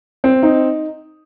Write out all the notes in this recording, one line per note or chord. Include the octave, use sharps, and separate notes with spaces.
C4
D#4